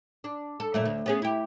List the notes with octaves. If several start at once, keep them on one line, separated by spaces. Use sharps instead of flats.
D4
A4
F#2 A#2 A3
D2
B3 C#4 G#4
E4 G4